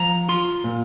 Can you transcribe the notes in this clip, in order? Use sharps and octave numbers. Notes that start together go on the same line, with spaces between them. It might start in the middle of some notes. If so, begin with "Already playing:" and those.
Already playing: F3 A#5
F4 C6
A#2